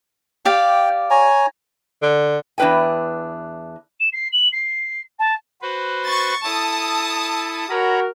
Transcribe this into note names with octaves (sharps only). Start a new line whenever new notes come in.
G4 D5 F5 G5
C#5 G#5 A#5
D3
E2 D4 E4 B4 G5 G#5
E7
C7
F#7
C7
A5
F#4 B4 C5
C#6 A6
E4 A4 A5 D#6
F#4 A#4 C#5 A#5 B5